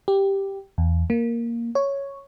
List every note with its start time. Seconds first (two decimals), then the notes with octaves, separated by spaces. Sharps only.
0.08 G4
0.78 E2
1.10 A#3
1.75 C#5